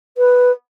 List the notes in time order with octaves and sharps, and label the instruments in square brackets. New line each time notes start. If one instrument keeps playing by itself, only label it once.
[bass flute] B4